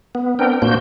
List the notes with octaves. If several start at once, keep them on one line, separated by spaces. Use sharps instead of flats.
B3
B3 C4 D4 A#4 G5
A#2 A#3 D4 F#4 C5 G6